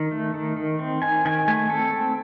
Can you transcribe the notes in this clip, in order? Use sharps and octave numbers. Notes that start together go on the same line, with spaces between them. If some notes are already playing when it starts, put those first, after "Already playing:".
Already playing: D#3
A3
D#3
D#3
C4
D#3 G#5
D#3 G#5
A3 G#5
C4 A4
C4